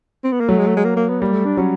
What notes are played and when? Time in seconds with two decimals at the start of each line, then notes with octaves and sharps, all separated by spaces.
0.24 C4
0.32 B3
0.40 A#3
0.49 F#3 A3
0.58 G#3
0.67 A3
0.77 G#3
0.85 A#3
0.97 A#3
1.09 B3
1.21 G3 A#3
1.33 A3
1.45 D4
1.57 F#3 C#4